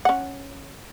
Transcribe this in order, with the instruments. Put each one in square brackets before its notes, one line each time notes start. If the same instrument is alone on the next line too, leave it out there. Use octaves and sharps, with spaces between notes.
[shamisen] C#4 F#5